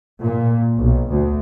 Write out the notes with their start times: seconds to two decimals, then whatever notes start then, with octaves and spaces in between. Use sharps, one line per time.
0.22 A#2
0.77 B1
1.09 D2